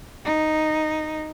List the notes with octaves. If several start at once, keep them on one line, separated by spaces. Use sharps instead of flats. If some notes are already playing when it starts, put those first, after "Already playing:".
D#4